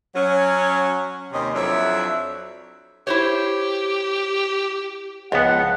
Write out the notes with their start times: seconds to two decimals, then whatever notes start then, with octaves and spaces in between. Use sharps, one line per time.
0.15 F#3 C#4
1.32 D#2 C3 C#4 D#5
1.54 F2 F#3 D4 E4 C#5 E5
3.07 E4 G4 C5 C#5
5.32 C#2 F3 G#3 B3 F#5